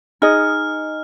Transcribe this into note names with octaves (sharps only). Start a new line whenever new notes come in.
D#4 G#4 D#5 F6